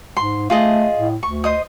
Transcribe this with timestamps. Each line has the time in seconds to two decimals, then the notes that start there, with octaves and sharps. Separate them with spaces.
0.17 G#2 C6
0.50 A3 F4 G#4 D#5
0.99 A2
1.23 D2 C#6
1.44 C5 D#5 D#6